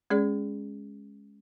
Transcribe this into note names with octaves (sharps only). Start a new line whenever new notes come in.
G#3 C#4 G#4 D5